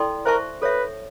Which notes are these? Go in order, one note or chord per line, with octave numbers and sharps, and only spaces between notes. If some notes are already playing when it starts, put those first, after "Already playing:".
Already playing: E4 A4 D5 G5 C6
A#4 C5 E5 A5 C#6
A4 B4 C#5 E5